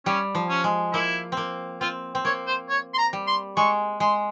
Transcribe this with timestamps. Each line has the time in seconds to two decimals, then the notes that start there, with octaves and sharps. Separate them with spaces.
0.06 G3 C#4
0.35 F3
0.49 C#4
0.64 G#3
0.93 A#3 E4
1.32 A#3 C4
1.81 C4 F4
2.15 C4
2.25 A#3 C#5
2.47 C5
2.69 C#5
2.94 C6
2.98 A#5
3.13 G3
3.27 C6
3.56 G#3 C#6
4.00 G#3 C6